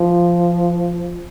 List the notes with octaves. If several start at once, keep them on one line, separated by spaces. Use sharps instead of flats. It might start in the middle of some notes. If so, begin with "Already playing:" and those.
Already playing: F3